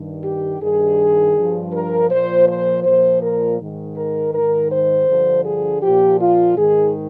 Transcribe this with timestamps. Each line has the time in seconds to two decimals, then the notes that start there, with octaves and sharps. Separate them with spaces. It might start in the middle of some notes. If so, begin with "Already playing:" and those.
Already playing: G2 D#3
0.23 G4
0.60 G2 D#3 G#4
1.34 G2 F3
1.73 A#4
2.09 A#2 F3 C5
2.47 C5
2.84 A#2 F3 C5
3.22 A#4
3.59 G#2 D#3
3.96 A#4
4.33 G#2 D#3 A#4
4.71 C5
5.07 G2 D3 F3
5.44 G#4
5.82 A#2 F3 G4
6.20 F4
6.56 G#2 D#3 G#4